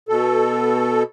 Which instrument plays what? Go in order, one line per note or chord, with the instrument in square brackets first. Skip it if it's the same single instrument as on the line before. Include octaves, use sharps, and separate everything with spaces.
[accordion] B2 A4